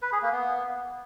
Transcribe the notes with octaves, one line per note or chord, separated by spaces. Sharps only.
B4
G#4
A#3
B3